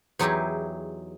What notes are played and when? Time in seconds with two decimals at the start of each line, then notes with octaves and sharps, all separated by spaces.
0.19 E2 F#3 D#4 E4 G4 G#4